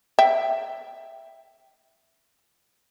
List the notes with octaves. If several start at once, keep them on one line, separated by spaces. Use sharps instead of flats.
E5 G5